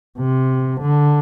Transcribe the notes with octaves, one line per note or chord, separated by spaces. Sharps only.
C3
D3